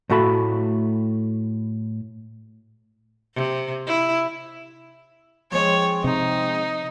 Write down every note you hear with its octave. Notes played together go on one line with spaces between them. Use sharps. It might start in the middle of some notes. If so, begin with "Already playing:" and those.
A2 A3 F#4 A4 B5
C3
E4
F3 G#3 C4 C#5
C3 D#4